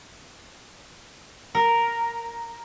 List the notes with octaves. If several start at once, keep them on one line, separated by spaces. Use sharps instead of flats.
A#4